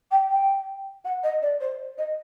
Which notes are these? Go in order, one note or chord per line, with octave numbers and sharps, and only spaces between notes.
G5
G5
F#5
D#5
D5
C5
D#5